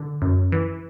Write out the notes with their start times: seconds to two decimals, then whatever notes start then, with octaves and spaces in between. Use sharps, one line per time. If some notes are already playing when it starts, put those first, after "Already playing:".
Already playing: D3
0.22 F#2
0.52 E3